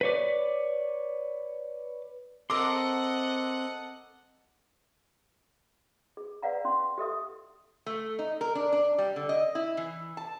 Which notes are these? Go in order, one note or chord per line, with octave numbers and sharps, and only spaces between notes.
B4 C#5 D5
C4 A4 A#4 D#5 E5 F#5 C6 D6
G#4
B4 D5 F5 F#5 A#5
C#4 C6
G4 A4 E5 D#6
A3
D#4
A#4
D4
D4
G3
D3
D#5
E4
E3
A5